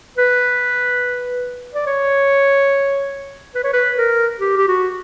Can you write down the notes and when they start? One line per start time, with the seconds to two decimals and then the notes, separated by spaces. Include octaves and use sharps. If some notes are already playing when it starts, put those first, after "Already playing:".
0.18 B4
1.75 D5
1.87 C#5
3.55 B4
3.64 C#5
3.74 B4
3.97 A#4
4.40 G4
4.57 G4
4.68 F#4